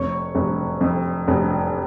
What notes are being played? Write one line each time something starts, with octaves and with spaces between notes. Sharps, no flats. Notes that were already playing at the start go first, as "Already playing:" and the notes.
Already playing: F1 C#5 C#6
F1
F2
F1